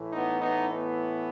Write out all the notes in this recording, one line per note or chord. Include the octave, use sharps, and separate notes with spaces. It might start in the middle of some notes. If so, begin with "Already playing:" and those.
Already playing: A2 E3 A3
B3 D#4
B3 D#4
B3